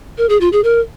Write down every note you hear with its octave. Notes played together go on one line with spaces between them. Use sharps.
A#4
G#4
F4
G#4
A#4